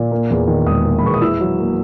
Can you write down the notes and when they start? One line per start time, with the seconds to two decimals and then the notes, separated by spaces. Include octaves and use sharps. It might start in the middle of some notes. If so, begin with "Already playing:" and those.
Already playing: A#2
0.11 A#3
0.30 E2
0.48 D#3
0.66 E1 D#6
0.85 A#3
0.99 B5
1.03 E2 C#6
1.14 D#6
1.21 E4 E6
1.40 F#3
1.59 A#3